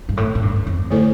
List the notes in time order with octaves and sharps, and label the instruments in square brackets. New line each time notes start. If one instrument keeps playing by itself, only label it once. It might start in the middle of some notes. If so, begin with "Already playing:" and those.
[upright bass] G2
A2
A2
G2
F2
[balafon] D3 A3 E4 A4 C5